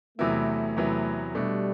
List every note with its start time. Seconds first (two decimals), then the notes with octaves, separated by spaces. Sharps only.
0.18 E2 C3 F#3 A3 B3 E4
0.77 E2 C3 F#3 B3 E4
1.35 B2 G3 A3 D4